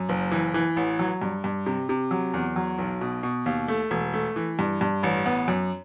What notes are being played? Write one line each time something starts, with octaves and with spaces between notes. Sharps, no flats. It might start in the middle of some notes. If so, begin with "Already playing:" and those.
Already playing: F#2
F#1
E3
E3
A1
F#3
G2
G2
C3
C3
F#3
E2
F#3
B1
B2
B2
D#2
A3
E1
A3
E3
G2
G2
A1
B3
F#2